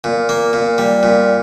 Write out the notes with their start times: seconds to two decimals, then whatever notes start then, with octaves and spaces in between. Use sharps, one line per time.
0.04 A#2
0.29 A#3
0.53 A#2
0.78 G3
1.03 A#2